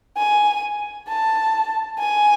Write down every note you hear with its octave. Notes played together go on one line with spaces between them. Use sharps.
G#5
A5
G#5